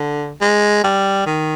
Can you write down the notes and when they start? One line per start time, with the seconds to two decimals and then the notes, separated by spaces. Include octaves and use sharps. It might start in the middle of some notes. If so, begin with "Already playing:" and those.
Already playing: D3
0.41 G#3
0.84 G3
1.26 D#3